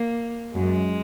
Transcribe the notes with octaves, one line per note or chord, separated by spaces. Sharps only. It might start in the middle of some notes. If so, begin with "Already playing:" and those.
Already playing: A#3
F#2 G#3